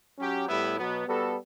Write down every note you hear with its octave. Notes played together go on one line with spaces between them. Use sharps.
F#3 C#4 G4
A2 G3 B3 E4
B2 F#3 B3
G3 B3 F#4 A4